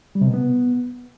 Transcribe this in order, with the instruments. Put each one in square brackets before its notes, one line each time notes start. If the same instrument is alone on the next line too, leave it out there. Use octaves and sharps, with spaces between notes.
[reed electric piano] G3
C3
B2
B3